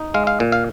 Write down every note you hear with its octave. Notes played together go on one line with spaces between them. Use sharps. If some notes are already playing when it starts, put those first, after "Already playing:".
Already playing: D#4
G#3 F5
F5
A#2
F5